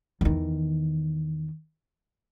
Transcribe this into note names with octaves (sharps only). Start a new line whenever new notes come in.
E2 D#3